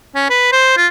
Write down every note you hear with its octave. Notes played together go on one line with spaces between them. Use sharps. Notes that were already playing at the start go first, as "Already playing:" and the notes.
C#4
B4
C5
F4